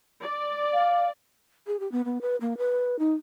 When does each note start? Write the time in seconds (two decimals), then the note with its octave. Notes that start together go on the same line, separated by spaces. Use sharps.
0.21 D5
0.73 F5
1.67 G#4
1.80 G4
1.92 B3
2.05 B3
2.21 B4
2.41 A#3
2.58 B4
2.99 D#4